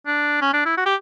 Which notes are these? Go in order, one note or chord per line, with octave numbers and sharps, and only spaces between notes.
D4
C#4
D4
E4
F#4
G4